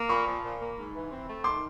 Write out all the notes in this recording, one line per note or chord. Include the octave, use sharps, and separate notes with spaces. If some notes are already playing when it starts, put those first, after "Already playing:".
Already playing: A#3
A#2 B5 C#6
F3
A#2
A#3
G#2
E3
C4
A3
D#3 C6 D6